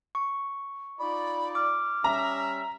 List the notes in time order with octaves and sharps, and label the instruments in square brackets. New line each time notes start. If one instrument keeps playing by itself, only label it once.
[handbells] C#6
[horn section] D#4 F4 D5 [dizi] B5
[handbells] D6 [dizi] F6
[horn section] G3 C#4 E5 [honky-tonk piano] A#5